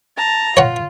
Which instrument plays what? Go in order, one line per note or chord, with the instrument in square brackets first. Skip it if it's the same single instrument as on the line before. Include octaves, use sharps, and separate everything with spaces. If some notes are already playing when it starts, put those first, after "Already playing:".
[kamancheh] A5 A#5
[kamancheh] F4 [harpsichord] C#5 F#5